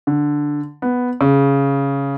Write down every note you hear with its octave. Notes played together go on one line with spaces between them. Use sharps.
D3
B3
C#3